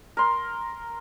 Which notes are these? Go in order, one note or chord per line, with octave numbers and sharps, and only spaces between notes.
A#4 C6